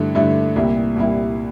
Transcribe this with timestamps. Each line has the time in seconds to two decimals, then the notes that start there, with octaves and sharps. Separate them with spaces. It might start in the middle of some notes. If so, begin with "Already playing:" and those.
Already playing: G2 D3 A3 E4
0.15 G2 D3 A3 E4
0.56 C2 A#2 G3 A#3 E4
0.96 C2 A#2 G3 A#3 E4